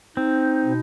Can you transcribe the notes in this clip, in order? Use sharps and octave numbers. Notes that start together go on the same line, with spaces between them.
C4 D#4
B2